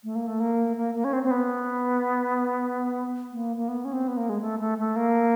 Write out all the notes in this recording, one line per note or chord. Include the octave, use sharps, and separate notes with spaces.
A3
A#3
A3
A#3
A#3
A#3
C#4
C4
C4
B3
A#3
A#3
B3
C#4
C4
B3
A#3
G#3
A3
A3
A3
A#3